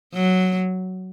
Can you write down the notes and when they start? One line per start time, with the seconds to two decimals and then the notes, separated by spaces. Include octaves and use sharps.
0.14 F#3